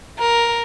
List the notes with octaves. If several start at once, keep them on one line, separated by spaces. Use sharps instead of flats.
A#4